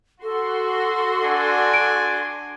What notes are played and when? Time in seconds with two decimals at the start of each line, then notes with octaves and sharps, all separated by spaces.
0.23 F#4 A4 C6
1.23 D4 D5 G#5
1.74 D7